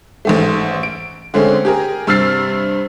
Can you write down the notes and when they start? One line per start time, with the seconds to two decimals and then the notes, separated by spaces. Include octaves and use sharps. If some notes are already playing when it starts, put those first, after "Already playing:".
0.25 A1 G#2 A3
0.83 D7
1.34 D3 G#3 A3 C4 C#4
1.65 G4 G#4 A#4
2.07 G2 C3 E6 F6 A6 C7